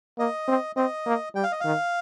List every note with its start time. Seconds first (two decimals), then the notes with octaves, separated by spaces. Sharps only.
0.18 A#3 D#5
0.48 C4
0.76 C4 D#5
1.06 A#3
1.35 G3 G5
1.43 F5
1.52 D#5
1.60 D#3 F5